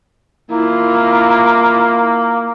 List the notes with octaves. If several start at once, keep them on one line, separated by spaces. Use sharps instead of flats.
A#3 E4 F4